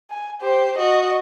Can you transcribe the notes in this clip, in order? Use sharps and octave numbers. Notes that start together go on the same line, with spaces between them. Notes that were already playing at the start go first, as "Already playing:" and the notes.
G#5
G4 C5
F#4 D#5